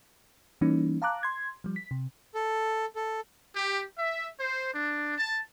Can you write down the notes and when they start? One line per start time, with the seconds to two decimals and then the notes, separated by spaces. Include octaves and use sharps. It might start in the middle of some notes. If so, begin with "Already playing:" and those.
0.61 E3 G3 A#3 C#4 D#4
1.02 F5 A5 A#5 D6 F#6
1.23 C6 G#6
1.64 F3 G3
1.76 B6
1.91 C3
2.35 A4
2.96 A4
3.55 G4
3.98 E5
4.40 C5
4.74 D4
5.18 A5